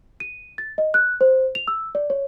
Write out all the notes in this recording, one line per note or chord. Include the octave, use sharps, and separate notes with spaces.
D#7
A6
D#5
F#6
C5
F7
E6
D5
C#5